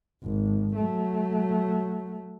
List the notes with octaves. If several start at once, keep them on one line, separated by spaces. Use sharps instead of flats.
G#1
F#3 A3